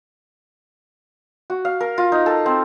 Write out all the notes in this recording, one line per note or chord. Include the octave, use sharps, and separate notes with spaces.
F#4
F5
A#4
F4
D#4
A4
C4